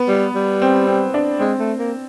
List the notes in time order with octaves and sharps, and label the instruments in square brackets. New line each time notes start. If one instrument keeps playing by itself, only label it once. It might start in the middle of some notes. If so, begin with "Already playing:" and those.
Already playing: [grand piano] B3
[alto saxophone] G3
G3
[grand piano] C4
C4
D4
[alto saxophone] G#3 [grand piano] C4
[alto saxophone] A3
A#3